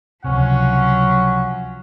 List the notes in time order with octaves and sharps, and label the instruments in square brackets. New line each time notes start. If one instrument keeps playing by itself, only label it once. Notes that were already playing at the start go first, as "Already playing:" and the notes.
[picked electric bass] C#2 C3 [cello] F3 F#3 [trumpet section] C#4 F#5